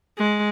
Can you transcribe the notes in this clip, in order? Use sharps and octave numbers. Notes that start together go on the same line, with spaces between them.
G#3